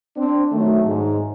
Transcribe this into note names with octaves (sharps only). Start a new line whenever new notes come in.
C4 D4
D#3 F#3 A3
G#2